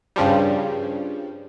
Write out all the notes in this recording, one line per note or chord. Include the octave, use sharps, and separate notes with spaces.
G2 C#3 F3 G3